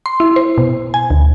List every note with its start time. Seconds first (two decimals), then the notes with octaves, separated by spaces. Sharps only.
0.06 C6
0.20 E4
0.36 C5
0.58 B2
0.94 G#5
1.10 D2